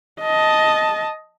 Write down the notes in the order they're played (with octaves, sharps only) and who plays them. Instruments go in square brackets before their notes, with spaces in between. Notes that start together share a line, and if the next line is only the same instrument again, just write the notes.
[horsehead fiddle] D#5 A5